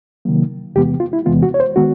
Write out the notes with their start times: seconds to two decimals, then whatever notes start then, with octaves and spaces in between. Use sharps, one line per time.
0.25 C3 D#3 F#3 A#3
0.75 E2 C3 E3 G#3 B3 G4
1.00 F4
1.13 E4
1.25 E2 C3 E3 G#3 B3 F4
1.43 F#4
1.54 C#5
1.60 C5
1.76 D#3 G#3 B3 F#4